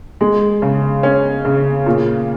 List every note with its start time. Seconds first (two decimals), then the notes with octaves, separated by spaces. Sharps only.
0.21 G#3
0.62 C#3
1.03 C#4
1.45 C#3
1.86 A#2